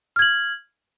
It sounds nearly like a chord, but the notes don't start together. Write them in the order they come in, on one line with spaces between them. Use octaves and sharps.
F6 G#6 F#7